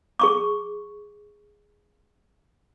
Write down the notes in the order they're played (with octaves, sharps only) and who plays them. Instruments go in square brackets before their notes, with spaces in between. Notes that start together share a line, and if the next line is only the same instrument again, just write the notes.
[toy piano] G#4 C#6 D6